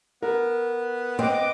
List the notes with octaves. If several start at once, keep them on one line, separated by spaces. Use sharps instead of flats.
B3 A#4
C4 D#5 D6